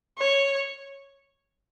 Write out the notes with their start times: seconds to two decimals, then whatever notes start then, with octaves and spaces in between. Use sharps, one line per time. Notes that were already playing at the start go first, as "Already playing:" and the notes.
0.18 C#5